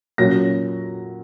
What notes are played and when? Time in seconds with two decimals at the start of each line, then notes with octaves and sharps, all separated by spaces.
0.18 A#2 F#3 C#4 A#6